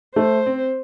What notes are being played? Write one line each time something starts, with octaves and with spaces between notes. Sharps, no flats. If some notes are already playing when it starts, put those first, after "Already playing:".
A3 C5
C4